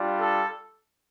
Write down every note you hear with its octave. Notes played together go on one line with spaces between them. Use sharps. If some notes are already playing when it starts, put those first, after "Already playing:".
Already playing: G3 D4 F4
A4